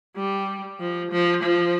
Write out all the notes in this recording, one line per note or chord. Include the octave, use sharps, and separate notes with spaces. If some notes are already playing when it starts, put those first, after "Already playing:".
G3
F3
F3
F3